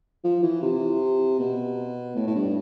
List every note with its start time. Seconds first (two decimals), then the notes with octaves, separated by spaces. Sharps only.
0.24 F3
0.43 E3
0.62 C3
1.40 B2
2.16 A2
2.27 A2
2.35 G2